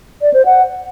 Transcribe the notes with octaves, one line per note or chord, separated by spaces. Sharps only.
D5
C5
F#5